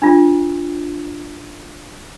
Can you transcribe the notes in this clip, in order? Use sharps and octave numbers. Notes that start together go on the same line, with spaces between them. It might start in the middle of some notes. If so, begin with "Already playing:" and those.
D4 F4